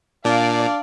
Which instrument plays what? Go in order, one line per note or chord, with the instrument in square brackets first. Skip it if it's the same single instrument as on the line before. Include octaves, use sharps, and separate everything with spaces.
[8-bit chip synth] A#2 [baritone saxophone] D4 [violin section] D5 F5